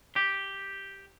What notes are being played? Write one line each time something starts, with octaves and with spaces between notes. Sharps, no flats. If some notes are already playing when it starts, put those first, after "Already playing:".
G4